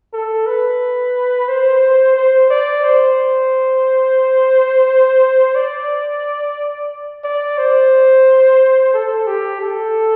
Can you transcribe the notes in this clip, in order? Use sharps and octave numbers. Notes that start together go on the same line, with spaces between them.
A4
B4
C5
C5
D5
C5
D5
D5
C5
A4
G4
A4